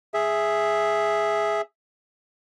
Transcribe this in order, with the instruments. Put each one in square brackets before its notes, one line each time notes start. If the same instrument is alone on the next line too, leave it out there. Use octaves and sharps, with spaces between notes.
[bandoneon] G#4 E5